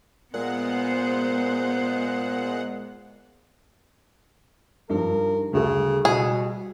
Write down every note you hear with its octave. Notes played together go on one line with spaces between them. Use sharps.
A#2 G#3 B3 C5 F#5
G2 D#3 F3 A#4
D2 C#3 G3 A4
B2 G3 G#4